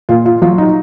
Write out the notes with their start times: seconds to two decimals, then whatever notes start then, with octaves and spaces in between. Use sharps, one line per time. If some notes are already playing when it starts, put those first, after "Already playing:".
0.09 A#2 F4
0.26 F4
0.42 F#3 F4
0.58 D#4